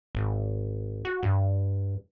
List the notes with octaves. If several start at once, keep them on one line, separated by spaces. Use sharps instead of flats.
G#1
F#4
G2